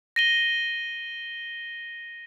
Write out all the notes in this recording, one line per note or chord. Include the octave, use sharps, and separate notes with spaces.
A#6 D#7 G7